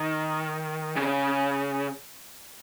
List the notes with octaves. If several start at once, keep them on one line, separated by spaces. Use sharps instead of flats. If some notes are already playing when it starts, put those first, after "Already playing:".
Already playing: D#3
C#3